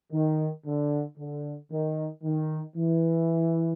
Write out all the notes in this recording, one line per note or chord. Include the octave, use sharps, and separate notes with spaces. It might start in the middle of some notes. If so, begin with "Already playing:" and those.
D#3
D3
D3
D#3
D#3
E3